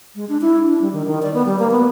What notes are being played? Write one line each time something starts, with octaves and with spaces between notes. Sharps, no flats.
G#3
D4
E4
D4
G3
D#3
D#3
D5
B3
G3
A#3
B3